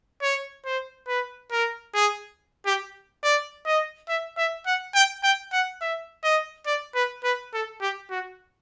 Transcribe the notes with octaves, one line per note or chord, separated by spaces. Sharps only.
C#5
C5
B4
A#4
G#4
G4
D5
D#5
E5
E5
F#5
G5
G5
F#5
E5
D#5
D5
B4
B4
A4
G4
F#4